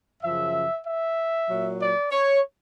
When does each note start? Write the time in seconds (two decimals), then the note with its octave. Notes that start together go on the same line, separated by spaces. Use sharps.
0.22 F#2 C#3 F3 E5
0.85 E5
1.48 A#2 F#3
1.80 D5
2.11 C#5